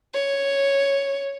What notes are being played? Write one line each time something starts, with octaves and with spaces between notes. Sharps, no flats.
C#5